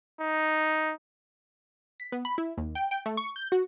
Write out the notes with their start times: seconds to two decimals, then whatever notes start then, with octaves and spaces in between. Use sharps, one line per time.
0.21 D#4
2.00 B6
2.12 B3
2.25 B5
2.38 E4
2.58 D#2
2.75 G5
2.91 G5
3.06 A3
3.17 C#6
3.36 G6
3.52 F#4